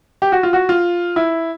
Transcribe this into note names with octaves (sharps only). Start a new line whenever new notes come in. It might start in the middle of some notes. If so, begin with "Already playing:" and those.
G4
F#4
F4
F#4
F4
E4